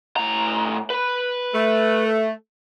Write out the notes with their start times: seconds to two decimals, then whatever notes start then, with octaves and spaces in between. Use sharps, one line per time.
0.16 A2 A#5
0.90 B4 B5
1.55 A3